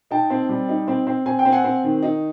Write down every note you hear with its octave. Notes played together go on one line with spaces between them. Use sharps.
D#4 G5 A5
C4
G3
D#4
C4
C4
C4 G#5
G5
C4
F#5 G#5
C4
D#3
D#4